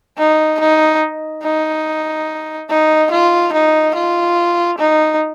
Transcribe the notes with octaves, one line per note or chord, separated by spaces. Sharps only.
D#4
D#4
D#4
D#4
F4
D#4
F4
D#4